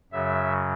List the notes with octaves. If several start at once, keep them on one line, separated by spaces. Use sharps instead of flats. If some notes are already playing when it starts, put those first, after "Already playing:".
F#2 C#3 F#3 E5